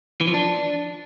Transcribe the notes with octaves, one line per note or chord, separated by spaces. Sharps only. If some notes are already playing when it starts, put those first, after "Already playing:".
E3
F3
D4